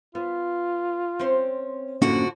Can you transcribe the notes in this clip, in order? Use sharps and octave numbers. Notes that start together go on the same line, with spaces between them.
B3 F4
C4 C#4 C5
F#2 A2 D3 F3 A#3 C#4 D4 F#4